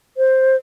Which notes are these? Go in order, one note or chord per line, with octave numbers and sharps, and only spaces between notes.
C5